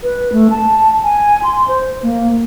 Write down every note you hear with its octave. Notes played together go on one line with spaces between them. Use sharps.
B4
A3
A5
G#5
C6
C5
A#3